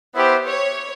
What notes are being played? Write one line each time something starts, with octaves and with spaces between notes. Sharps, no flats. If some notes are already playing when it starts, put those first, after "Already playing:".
B3 E4 G4 C5
C#5